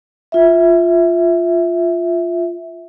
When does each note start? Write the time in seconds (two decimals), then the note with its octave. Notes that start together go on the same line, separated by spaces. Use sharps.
0.32 F4 E5